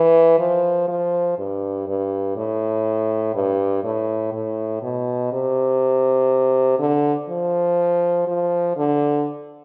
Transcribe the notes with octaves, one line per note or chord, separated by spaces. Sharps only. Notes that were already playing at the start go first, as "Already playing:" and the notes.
Already playing: E3
F3
F3
G2
G2
A2
G2
A2
A2
B2
C3
D3
F3
F3
D3